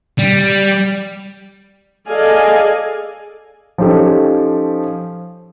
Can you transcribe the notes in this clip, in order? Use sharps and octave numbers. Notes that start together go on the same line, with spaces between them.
G3
G#4 A4 D5 D#5 F5 G#5
F3 C#4 D#4 G4 A4 C#5